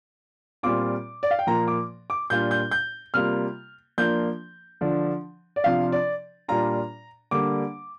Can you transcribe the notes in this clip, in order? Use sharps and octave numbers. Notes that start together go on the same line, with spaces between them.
A#2 G3 C4 F4 D6
D5
F5
G5
A#2 F3 A#3 A#5
D6
D6
A#2 G3 D4 F4 G6
G6
G6
C3 G3 A#3 F4 F6
F3 A#3 D4 F4 G6
D3 F3 D4
D5
C3 F3 D4 F4 F5
D5
A#2 G3 D4 F4 A#5
D3 G3 A#3 D6